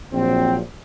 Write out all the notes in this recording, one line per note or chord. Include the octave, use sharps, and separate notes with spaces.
A#1 A#2 F#3 C4